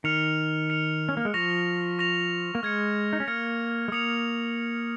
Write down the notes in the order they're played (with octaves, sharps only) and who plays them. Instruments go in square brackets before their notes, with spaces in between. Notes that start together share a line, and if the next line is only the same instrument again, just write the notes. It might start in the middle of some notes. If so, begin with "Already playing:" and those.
[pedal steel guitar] D#3 [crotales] F6 C#7 F7
[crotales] F6 C#7 F7
[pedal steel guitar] C#4
A#3
G#3
[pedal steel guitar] F3 [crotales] C#6 A#6 F7
[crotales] C#6 A#6 F7
[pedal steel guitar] A#3
[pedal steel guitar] G#3 [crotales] F6 G#6 C#7
[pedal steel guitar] D#4
C#4
[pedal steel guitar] A#3 [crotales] F6 G#6 C#7
[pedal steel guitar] G#3
[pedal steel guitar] A#3 [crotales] D#6 C#7 F7